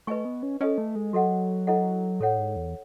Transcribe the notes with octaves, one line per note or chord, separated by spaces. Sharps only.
A3 B4 D#5 G#5 C#6
B3
C#4
C#4 A4 D#5 G#5
A3
G#3
F#3 F#4 A4 D#5 F#5
E4 A4 D#5 F#5
A2 A4 C#5 F#5
G#2
E2